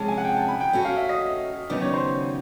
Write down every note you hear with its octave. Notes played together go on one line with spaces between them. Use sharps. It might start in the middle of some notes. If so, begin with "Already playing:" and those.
Already playing: C3 F3 G#3 C#4 A5
G#5
F#5
G5
A5
B5
G5
A3 C#4 F#4
F5
E5
D#5
D#2 C#3 F#3 B3 D#4 D5
C#5
C5